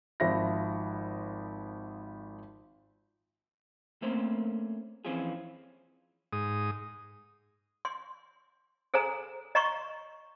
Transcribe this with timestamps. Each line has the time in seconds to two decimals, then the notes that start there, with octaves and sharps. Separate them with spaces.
0.20 G#1 F3 E5 B5 A#6
4.02 A3 A#3 C4 C#4 C5
5.05 F2 E3 C4 C#4 F4 G#4
6.33 G#2 D#6
7.85 C6
8.94 G#4 A4 C5 G#5 A#5
9.55 D#5 A#5 C6 C#6